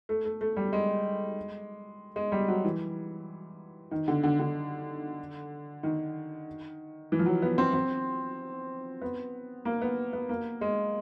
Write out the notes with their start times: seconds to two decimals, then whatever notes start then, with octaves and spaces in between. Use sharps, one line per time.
0.09 A3
0.25 A3
0.41 A3
0.56 G3
0.73 G#3
2.16 G#3
2.32 G3
2.48 F#3
2.64 E3
3.91 D#3
4.08 D3
4.23 D3
4.39 D3
5.83 D#3
7.12 E3
7.19 F3
7.26 F#3
7.42 B3
7.58 C4
7.74 C4
9.01 B3
9.65 A#3
9.81 B3
10.13 B3
10.29 A#3
10.61 G#3